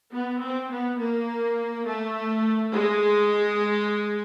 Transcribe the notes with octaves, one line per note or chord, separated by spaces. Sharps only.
B3
C4
B3
A#3
A3
G#3